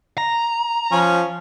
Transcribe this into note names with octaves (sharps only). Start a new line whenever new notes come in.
A#5
F3 C#4